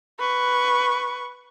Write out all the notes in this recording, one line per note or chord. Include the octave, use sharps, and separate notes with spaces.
B4 C#6